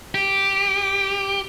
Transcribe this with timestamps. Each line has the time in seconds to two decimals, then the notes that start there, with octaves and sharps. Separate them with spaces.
0.15 G4